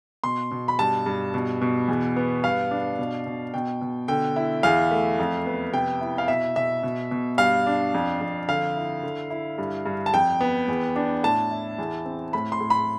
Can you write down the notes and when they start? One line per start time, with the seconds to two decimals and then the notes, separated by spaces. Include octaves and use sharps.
0.24 B2 C6
0.51 B2
0.68 B5
0.79 G2 A5
1.06 G2
1.34 B2
1.61 B2
1.88 E2
2.16 B3
2.43 G2 F5
2.71 D4
2.98 B2
3.26 B2
3.54 B2 G5
3.81 B2
4.08 D3 G5
4.36 E4
4.63 E2 F5
4.91 A3
5.19 F2
5.46 B3
5.73 C3 G5
6.01 E4
6.18 F5
6.28 B2 E5
6.56 B2 E5
6.83 B2
7.11 B2
7.38 G2 F5
7.66 D4
7.94 F2
8.21 F2
8.48 D3 F5
8.76 E4
9.03 D3
9.30 E4
9.58 G2
9.86 G2
10.06 A5
10.13 F2 G5
10.41 B3
10.68 E2
10.96 D4
11.24 A2 A5
11.51 E4
11.79 E2
12.05 C4
12.33 A2 B5
12.52 C6
12.60 A2
12.70 B5